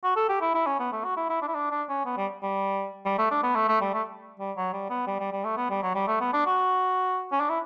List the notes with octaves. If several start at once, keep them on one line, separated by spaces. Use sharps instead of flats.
F#4
A4
G4
E4
E4
C#4
B3
A3
F#4
E4
E4
D4
E4
D4
D4
C#4
B3
G3
G3
G3
A3
D4
B3
A3
A3
G3
A3
G3
F#3
G3
B3
G3
G3
G3
A3
B3
G3
F#3
G3
A3
B3
D4
F#4
C#4
D4
E4